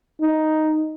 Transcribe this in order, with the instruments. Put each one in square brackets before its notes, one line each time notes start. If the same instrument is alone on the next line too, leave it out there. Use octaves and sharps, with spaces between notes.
[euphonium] D#4